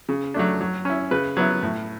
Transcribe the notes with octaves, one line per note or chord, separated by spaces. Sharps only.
C#3
F#3 A3 D4
F#3
C#4 E4
C#3 B4
F#3 B3 E4
A2